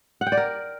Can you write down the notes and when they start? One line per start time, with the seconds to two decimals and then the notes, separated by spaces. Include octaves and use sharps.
0.21 F#5
0.27 G5
0.32 D5
0.37 A#4